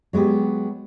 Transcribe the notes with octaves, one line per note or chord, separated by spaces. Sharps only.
F#3 G#3 B3 G4